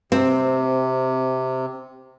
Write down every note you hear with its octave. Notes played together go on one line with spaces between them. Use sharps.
C3 C4